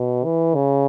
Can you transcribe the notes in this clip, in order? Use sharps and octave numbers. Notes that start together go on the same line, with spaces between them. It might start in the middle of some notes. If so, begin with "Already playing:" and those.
Already playing: B2
E3
C#3